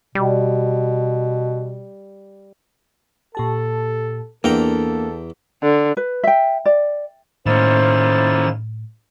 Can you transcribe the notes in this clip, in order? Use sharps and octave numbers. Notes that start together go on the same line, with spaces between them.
B2 G3
A#2 G4 A4 A5
E2 A#3 D4 A4 G5 A#5
D3
B4
E5 G5
D5
A2 D#3 A#3 C#4 E4 C5 A6